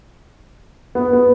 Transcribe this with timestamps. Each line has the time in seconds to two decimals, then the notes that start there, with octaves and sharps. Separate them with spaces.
0.95 B3
1.13 B3